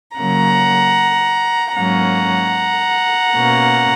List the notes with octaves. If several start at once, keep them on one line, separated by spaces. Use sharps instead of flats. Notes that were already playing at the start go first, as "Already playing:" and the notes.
C#3 F#3 A#3 F#5 A#5
G#2 F#3 A#3 C#4 F#5 A#5
B2 A#3 C#4